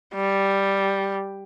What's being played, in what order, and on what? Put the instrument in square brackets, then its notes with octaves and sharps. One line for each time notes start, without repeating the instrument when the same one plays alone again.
[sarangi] G3